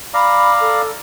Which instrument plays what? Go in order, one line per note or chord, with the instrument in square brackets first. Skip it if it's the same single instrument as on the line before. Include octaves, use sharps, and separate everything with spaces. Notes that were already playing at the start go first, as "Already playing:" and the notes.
[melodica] D5 F5 A#5 [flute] B5
[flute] A4